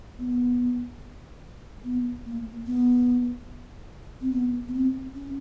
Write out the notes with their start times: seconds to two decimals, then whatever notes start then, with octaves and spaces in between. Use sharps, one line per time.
0.18 B3
1.84 B3
2.26 A#3
2.66 B3
4.21 C4
4.32 B3
4.68 B3
4.74 C4
5.15 C#4